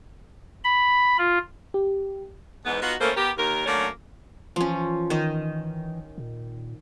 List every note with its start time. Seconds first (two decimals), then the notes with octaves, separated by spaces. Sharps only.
0.64 B5
1.18 F4
1.74 G4
2.65 E2 G#2 B3
2.81 B3 D#4 F4 F#4
2.99 E3 A3 A#3 C#4 A4 C5
3.16 B3 G4 A#4
3.37 D#2 A#4
3.66 D3 F#3 A3 A#3 C#4
4.56 E3 F3 C#4
5.10 D#3 D#5
6.18 A#2